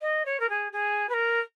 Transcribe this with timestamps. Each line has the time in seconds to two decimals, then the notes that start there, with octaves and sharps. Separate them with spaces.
0.01 D#5
0.25 C#5
0.40 A#4
0.49 G#4
0.72 G#4
1.09 B4
1.14 A#4